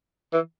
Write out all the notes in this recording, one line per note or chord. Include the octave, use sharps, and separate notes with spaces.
E3